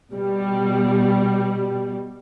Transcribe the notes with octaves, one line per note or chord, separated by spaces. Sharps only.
B2 G3